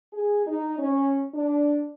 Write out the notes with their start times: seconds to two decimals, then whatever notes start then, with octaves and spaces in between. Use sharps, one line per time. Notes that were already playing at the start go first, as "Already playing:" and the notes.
0.12 G#4
0.46 D#4
0.79 C#4
1.35 D4